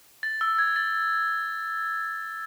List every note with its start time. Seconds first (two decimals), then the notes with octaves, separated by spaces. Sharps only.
0.23 A6
0.41 E6
0.58 G#6
0.76 A6